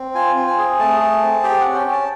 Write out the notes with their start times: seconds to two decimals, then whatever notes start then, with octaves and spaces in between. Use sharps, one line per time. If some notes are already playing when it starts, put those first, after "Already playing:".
Already playing: C4
0.15 F4 G#5
0.36 C4
0.47 G#5
0.58 G#4
0.79 A3 A5
1.00 G#4
1.23 C4
1.43 G4 G5
1.60 C#4 F#5
1.75 G5
1.87 C#4
1.92 A5